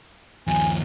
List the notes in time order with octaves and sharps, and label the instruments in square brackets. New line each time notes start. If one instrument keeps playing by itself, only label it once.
[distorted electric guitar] D#2 F3 [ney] G#5